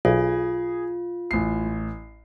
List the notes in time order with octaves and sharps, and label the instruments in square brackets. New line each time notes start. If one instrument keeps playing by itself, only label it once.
[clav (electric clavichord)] B1 [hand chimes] F4 [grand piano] G#4
[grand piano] A1 C7